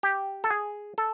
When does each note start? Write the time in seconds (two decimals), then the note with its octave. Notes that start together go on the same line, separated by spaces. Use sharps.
0.03 G4
0.44 A4
0.50 G#4
0.98 A4